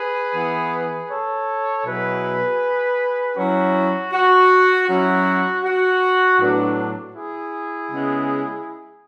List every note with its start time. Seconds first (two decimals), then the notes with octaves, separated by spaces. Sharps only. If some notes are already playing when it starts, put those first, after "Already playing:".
Already playing: G#4 B4
0.34 E3 B3 E4
1.10 A4 C#5
1.85 B2 F#3 B3 E4 G#4 B4
3.36 F#3 C#4 E4 F#4
4.12 F#4
4.87 F#3 C#4 E4 F#4
5.63 F#4
6.39 A2 F#3 B3 D4
7.14 E4 G#4
7.90 C#3 G#3 B3